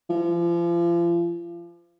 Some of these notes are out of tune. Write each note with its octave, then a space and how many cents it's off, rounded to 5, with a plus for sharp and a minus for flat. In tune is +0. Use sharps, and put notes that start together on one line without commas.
F3 -35